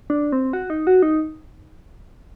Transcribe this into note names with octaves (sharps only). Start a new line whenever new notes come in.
D4
C4
F#4
D#4
F#4
D#4